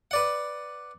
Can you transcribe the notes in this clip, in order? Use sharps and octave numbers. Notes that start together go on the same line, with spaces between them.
B4 D5 F#5